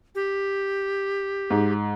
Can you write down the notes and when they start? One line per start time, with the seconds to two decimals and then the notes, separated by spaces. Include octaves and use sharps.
0.15 G4
1.50 G#2